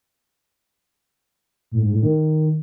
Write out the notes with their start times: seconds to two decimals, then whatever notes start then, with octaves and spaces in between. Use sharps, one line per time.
1.72 A2
1.82 G#2
1.92 A2
2.03 D#3